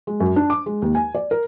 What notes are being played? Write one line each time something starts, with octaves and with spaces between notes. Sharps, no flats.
G#3
F#2
D4
D6
G#3
D#2
G#5
D5
A#4